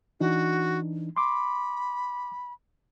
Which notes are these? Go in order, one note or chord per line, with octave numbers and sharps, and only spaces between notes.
E3 D4 D#4 F#4
B5 C6 D6